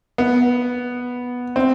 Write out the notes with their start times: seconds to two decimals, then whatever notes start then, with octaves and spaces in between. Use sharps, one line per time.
0.18 B3
1.56 C4